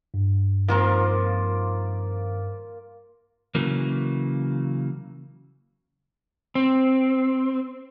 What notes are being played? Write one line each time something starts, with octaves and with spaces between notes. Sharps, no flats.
G2
D#3 F3 A#3 C4 F4 A#4
C#3 E3 F#3 A#3
C4